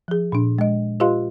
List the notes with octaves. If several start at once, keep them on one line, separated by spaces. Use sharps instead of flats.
F3 G#4
A#2 D4
G#3 D#5
F4 G4 B4 D#5 F5 C6